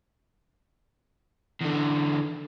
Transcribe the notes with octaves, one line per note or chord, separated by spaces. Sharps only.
E2 D3